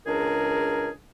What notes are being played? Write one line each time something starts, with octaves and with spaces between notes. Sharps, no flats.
C#2 D4 G#4 A#4